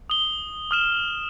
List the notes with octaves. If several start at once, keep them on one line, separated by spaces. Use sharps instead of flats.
D#6 G7
D#6 F6 E7